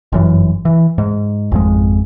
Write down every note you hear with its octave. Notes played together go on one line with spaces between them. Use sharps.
G1 F#2 E3
E3
G#2
G#1 F2 G#3